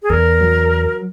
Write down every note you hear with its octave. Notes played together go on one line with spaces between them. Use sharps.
G#4
E2 A#4
F#3